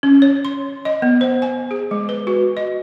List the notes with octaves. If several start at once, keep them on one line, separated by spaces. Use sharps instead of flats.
C#4
C#5
C6
D#5
B3
C5
G#5
G#4
G#3
B4
F#4
D#5